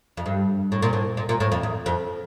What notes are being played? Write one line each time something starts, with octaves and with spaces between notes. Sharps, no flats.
F2
G2
A2
A#2
A2
A#2
A#2
A2
F2
E2
F2